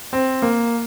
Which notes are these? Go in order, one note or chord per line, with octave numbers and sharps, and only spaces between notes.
C4
A#3